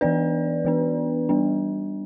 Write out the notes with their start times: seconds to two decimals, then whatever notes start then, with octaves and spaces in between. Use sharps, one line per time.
0.01 E3 B3 D4 B4 D5
0.65 E3 B3 D4
1.29 G3 B3 D4